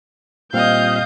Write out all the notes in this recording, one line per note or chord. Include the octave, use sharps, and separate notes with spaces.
A#2 G3 C4 D#5 F5 G6